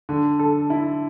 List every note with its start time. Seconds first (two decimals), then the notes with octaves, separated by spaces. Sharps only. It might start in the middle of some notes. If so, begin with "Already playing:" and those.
0.09 D3
0.39 A4
0.70 E4